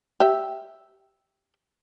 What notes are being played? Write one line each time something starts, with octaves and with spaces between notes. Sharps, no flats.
G4 E5